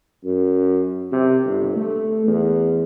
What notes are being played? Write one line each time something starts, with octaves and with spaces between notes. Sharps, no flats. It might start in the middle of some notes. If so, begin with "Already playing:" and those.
F#2
C3
G1
A3
E2